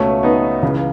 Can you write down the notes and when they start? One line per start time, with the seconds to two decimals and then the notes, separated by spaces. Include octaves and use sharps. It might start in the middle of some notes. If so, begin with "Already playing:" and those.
Already playing: C#2 B2 A3 C#4
0.23 B3 D#4
0.62 C#2 C#3 E3